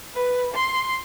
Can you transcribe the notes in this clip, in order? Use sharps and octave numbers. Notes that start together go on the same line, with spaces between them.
B4
C6